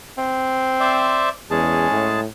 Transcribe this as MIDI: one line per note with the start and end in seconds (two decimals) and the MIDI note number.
0.18 1.32 60
0.80 1.29 72
0.80 1.29 74
0.80 1.29 76
1.51 1.91 40
1.51 2.20 56
1.51 2.15 61
1.51 2.20 68
1.51 2.20 81
1.91 2.26 45